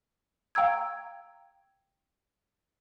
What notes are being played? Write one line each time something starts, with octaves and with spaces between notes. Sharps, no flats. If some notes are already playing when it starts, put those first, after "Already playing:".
F5 G5 A#5 E6 G#6